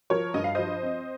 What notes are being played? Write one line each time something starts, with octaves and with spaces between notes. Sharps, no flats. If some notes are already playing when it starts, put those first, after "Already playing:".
F3 A#4 C#5
G2 D#5
F5
F3 C5 D#5
C4